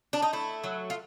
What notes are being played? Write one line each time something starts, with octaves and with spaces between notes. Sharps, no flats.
D4
D#4
A3 E4
F#3
F4